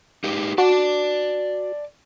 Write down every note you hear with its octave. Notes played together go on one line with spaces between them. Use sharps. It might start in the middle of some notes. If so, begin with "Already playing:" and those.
D#4 G4 B4
F#4 D5 A5